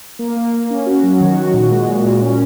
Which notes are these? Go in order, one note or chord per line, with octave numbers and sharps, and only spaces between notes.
A#3
A#3
A#3
C#4
F#4
F#3
D#3
F#4
A#2
G#3
A#2
A#2
C#4